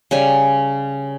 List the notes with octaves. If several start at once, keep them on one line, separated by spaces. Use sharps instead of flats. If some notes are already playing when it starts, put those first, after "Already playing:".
C#3 G3 G#5